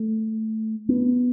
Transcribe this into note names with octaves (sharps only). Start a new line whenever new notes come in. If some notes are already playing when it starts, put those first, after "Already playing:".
Already playing: A3
B3